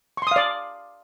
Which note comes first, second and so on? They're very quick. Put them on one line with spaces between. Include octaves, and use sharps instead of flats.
C#6 C6 D#6 F5 D5